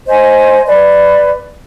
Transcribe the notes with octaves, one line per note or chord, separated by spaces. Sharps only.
C5 D#5 G#5 G6
B4 D5